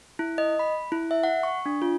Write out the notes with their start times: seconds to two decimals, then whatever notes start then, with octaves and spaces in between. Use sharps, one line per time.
0.19 E4
0.38 D#5
0.59 B5
0.92 E4
1.11 E5
1.24 F#5
1.43 C#6
1.66 D4
1.82 F4